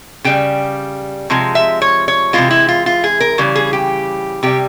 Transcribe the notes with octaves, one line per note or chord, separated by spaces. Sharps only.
C#3 G3 G5
C3 F3 G#3
E5
C#5
C#5
C3 E3 G#3 F4
E4
F4
F4
G#4
A#4
C#3 E3 G3
G#4
G4
C3 G3 G4